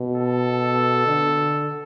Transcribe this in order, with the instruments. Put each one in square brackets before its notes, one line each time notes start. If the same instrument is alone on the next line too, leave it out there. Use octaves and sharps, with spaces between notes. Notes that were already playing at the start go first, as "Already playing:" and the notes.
Already playing: [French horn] B2
[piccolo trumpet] A4
[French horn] D3